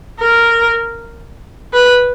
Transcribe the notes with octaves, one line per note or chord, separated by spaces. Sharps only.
A#4
B4